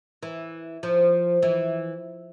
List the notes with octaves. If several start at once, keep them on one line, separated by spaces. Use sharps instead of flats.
E3
F3
E3